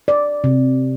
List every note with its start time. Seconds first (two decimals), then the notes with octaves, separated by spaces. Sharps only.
0.08 D5
0.44 C3